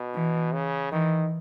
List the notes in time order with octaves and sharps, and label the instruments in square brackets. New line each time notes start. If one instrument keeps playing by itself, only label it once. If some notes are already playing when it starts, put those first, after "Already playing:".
Already playing: [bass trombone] B2
[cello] E3
[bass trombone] C#3
[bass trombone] D#3 [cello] E3